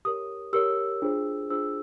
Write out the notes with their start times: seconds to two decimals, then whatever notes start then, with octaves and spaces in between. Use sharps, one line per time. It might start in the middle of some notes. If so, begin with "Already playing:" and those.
0.05 G4 A#4 C#5 D#6
0.53 G4 A#4 C#5 E6
1.02 D4 F4 G#4 C5
1.50 D4 F4 G#4 C5 E6